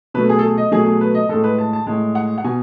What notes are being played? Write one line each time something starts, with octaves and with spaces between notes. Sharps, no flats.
B2 F#3 A3 B4
G#4
A4
G#4
D#5
B2 F#3 A3 G#4
G#4
B4
D#5
A2 G#3 A4
B4
A5
A5
A2 G#3
F#5
F#5
B2 G#5